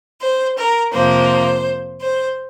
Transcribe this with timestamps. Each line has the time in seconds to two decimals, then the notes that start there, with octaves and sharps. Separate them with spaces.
0.20 C5
0.56 A#4
0.92 F2 C3 F3 A#3 C5
1.99 C5